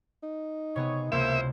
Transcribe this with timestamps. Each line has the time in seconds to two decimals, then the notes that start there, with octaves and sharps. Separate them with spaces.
0.23 D#4
0.76 C3 B3 G#4 C#5
1.12 E1 C#2 C3 A#3 E4 F4 C5 E5